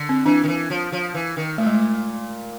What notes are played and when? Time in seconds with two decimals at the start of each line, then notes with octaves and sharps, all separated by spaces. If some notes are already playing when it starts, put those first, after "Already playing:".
Already playing: D3
0.09 C4
0.26 E3 D4
0.44 D#3
0.48 E3
0.70 F3
0.92 F3
1.14 E3
1.37 D#3
1.58 A#2 A3
1.66 G#3
1.74 A3